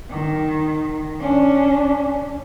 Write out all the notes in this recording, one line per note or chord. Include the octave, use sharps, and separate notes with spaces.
D#3
C#4 D4